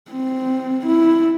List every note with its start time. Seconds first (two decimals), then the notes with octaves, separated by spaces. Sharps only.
0.11 C4
0.86 E4